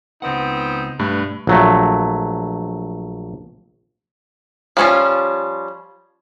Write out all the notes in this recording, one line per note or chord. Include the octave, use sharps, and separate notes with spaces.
C#2 B3 C4 D#4 F#5
B1 G2 A3 B4 B5
A#1 F#3 A3
F3 G3 C#4 D#4 F4